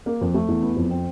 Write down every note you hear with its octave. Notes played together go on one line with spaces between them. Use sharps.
A#3
F2
A3
E2
B3
F2
C4